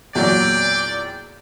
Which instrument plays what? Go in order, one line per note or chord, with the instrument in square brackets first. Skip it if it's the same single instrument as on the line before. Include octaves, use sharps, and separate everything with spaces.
[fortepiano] E2 A#2 F#3 [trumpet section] D5 G5